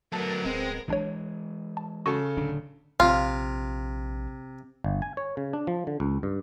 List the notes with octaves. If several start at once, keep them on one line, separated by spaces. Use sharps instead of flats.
F#3 A3 B3 A#4 A5
D1 G#3 C4
B1 E3 G#3 D4 C#5
A5
C#3 F#4 A4 A5
D1 D3 D4
A#1 C3 F4
G1
G#5
C#5
C#3
D4
F3
D3
C#2
G2